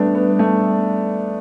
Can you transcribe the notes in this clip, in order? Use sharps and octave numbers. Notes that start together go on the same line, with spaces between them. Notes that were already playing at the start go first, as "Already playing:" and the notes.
Already playing: G3 A3 B3 D4
B3
A3